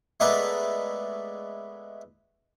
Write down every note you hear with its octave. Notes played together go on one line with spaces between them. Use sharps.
G#3 A3 B3 A#4 B4 D5